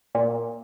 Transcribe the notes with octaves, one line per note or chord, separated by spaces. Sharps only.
A#2